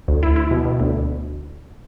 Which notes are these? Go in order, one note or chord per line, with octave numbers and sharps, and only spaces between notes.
D2
E4
E4
B2
B2
D2